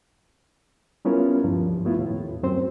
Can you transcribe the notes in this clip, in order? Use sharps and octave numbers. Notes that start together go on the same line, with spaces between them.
G3 B3 C#4 E4 F4 A#4
D2 G2 F3
A3 B3 E4 F4
D#2 A2
F#2 C4 C5